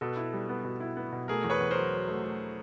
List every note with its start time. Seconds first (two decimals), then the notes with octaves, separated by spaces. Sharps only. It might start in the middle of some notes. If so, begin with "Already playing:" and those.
0.01 B2 A4 B4
0.16 E4
0.33 G3
0.49 B3
0.65 B2
0.80 E4
0.97 B3
1.12 B2
1.28 A3 G#4 A#4
1.44 E2
1.50 B4 C#5
1.60 E2
1.71 A#4 C5
1.77 F#3
1.93 F#3
2.08 A3
2.24 A3